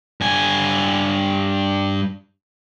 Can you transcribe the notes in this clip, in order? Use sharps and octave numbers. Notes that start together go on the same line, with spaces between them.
G2 G#5